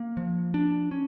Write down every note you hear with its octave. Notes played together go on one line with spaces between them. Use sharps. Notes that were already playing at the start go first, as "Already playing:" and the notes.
Already playing: A#3
F3
D4
C#4